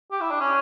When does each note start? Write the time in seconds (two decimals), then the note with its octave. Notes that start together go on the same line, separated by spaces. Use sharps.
0.12 G4
0.21 E4
0.31 D4
0.40 C#4